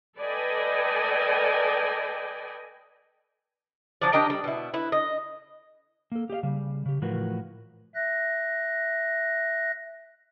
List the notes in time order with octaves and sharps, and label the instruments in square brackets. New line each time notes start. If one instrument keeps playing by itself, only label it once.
[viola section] A4 B4 D5 D#5 G5 G#5
[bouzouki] F3 F#3 D4 D5
D4 G4 A#4 D#5
G3
B2 E4
E4 B4
D#5
[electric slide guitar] A#3 A4
G4 G#4 D#5 F5
C#3 G3
C#3 G4
A2 E3 F3 F#4 A#4 B4
[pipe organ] E5 F#6 A#6